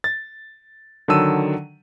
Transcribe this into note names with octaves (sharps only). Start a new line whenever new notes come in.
A6
D3 D#3 F#3 A5 E6 D#7